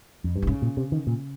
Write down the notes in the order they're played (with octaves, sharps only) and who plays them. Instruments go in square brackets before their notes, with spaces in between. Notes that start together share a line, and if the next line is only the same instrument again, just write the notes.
[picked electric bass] F2
G2
[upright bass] D#3
[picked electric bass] G#2 [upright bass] C#3
[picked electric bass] A#2
C3
D#3
A#2